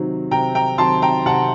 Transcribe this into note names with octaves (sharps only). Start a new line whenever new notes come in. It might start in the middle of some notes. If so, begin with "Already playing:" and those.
Already playing: C3 D#3 F#3 C4 D#4
C3 G5 A#5
G5 A#5
D#3 F#3 C4 D#4 A5 C6
G5 A#5
C3 F#5 A5